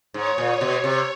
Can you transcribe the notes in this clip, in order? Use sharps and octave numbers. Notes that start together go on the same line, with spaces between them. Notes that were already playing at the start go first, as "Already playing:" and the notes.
G#2 C#5
A#2
C#5
B2
C#5
C3